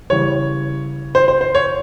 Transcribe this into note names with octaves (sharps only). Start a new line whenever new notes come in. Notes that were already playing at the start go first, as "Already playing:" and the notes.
C#3 E3 G3 C#5
C5
C5
C5
C#5